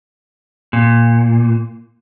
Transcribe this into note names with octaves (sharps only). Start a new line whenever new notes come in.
A#2